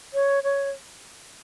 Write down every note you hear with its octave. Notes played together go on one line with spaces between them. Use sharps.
C#5
C#5